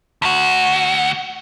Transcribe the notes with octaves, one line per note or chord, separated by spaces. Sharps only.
D2 F#4